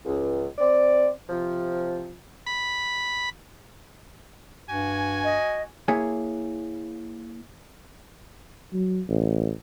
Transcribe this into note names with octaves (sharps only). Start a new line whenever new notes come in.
C#2
C4 D5
C3 F3
B5
G2 F#4 G#5
D#5
A#3 E4 G#4 C#5 G#5
F#3
A1